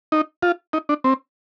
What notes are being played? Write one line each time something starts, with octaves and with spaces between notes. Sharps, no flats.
D#4
F4
D#4
D4
C4